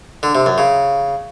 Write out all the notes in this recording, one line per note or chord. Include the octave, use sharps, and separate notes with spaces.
D3
C3
F#2
C#3